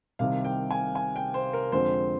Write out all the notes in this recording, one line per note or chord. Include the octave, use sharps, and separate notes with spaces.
C2 C3 D#3 G3 F5
G5
G#5
G#5
G5
C5
A#4
F2 D3 G#3 C4 C5